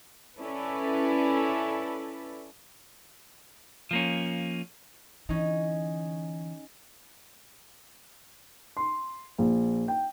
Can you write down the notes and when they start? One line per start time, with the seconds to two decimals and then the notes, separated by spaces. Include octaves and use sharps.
0.39 C#4 E4 A4 B4 D5
3.91 F3 A#3 C#4
5.29 D3 E3 C#4 D#4
8.77 C6
9.38 A#1
9.88 G5